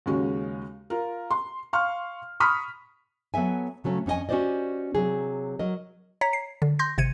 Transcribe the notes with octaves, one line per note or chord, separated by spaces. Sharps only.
D#2 C#3 G#3 C#4 F#4
F4 A#4
C6
F5 C6 C#6 F6
B5 C#6 D#6 F6 B6
F#3 B3 A4 E5 G#5
C#3 F#3 A3 C#4
F2 C#4 D#4 D#5 G#5
C#4 F#4 G4 C5 D5 D#5
C3 F#3 G#4
F#3 A#4 D#5
C#5 A#5 B6
C7
D3
C6 G6 A#6
G#1 C3 G#6 C#7 D#7